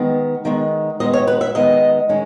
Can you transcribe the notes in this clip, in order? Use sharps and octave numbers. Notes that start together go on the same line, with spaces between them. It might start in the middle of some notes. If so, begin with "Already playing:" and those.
Already playing: D#3 G#3 B3
D#3 G#3 B3
D#3 G#3 B3 D#5
C#5
B4
E5
D#3 G#3 B3 D#5
D#3 G#3 C#4